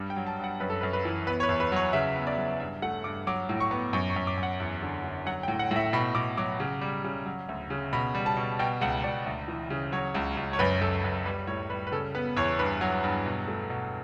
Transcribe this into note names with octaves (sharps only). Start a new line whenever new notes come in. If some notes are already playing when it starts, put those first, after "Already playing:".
Already playing: G2 G3
G5
F#3
A5
G2 F#5
F#2 B4
A4
F#2 B4
B4
E3
B3 B4
C#5
B4
E2
B4
F#3 C#5
C#3 E5
B3
D5
F#3
G2 E5
A3 F#5
G2 D6
F#3 D6
A2
C#6
B3
F#2 C#6
C#6
F#2
D6
F#2
F#5
E2
D3
D3
F#3 F#5
G5
A2
F#5
A2 E5
B2 B5
B2 D6
F#3 D6
C#3
G3
C#3
F#3
D2
C#3
B2 B5
G3
A5
B2
B2 G5
C#2 F#5
C#2 D5
D2
E3
C#3
F#3 C#5
C#2
C#2
C#5
F#2 B4
F#2 A4
F#2 B4
G3 B4
A2 C#5
G3 B4
B4
C#3 A4
B3 B4
E2 C#5
G2 B4
F#3
G2
B2
A3
B2